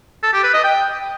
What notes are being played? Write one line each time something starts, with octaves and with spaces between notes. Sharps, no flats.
A4
G4
B4
D#5
G5